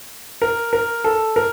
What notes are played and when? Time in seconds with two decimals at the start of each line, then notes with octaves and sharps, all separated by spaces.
0.42 A#4
0.73 A#4
1.04 A4
1.36 A#4